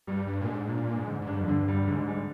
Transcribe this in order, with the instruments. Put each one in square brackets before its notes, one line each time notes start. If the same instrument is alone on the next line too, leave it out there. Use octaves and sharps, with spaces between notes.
[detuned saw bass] G2 [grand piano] G3
[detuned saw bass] G2 [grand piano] D4
[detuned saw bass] A#2
[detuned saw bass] G#2 [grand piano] D4
[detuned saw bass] A#2 [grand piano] D4
[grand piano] D4
[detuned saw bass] G#2
[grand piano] D3
[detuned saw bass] G#2
[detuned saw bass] G2 [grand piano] D4
[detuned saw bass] F2
[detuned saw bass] G2 [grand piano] D3
[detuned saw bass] G2 [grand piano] G3
[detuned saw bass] G2
[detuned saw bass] G#2 [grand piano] D3
[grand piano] G3